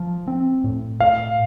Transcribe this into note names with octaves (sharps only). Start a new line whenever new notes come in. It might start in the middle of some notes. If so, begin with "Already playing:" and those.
Already playing: F3
C4
A2
A2 F5